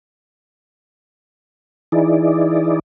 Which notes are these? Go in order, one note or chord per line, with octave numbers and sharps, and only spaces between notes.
E3 D#4 E4 G#4 D5